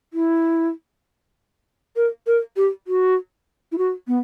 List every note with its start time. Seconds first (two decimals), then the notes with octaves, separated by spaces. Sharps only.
0.13 E4
1.96 A#4
2.27 A#4
2.57 G4
2.87 F#4
3.72 E4
3.78 F#4
4.08 B3